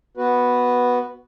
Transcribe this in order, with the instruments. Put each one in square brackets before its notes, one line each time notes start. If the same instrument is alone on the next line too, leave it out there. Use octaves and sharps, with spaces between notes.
[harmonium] B3 F#4 B4